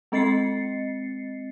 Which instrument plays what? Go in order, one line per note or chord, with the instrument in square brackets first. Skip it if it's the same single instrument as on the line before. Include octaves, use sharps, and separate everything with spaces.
[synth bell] G#3 C4 D#5 A6 C7 C#7